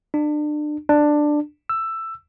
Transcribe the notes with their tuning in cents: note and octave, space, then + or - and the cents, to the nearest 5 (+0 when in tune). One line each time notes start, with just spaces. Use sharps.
D4 +30
D4 +10
E6 +10